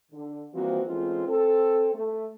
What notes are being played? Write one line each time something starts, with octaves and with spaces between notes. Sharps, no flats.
D3
E3 F3 G3 A#3 C4 F#4
E3 G#3 A3 C4 C#4 F4
C4 A4
A3